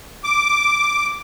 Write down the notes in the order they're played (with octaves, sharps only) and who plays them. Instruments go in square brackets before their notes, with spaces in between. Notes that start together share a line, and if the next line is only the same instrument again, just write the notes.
[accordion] D6